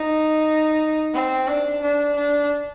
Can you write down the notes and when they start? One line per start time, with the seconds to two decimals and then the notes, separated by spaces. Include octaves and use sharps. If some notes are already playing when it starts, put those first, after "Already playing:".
Already playing: D#4
1.13 C4
1.47 D4
1.81 D4
2.15 D4